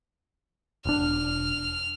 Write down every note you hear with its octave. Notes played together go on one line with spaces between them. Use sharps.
E1 D4 F6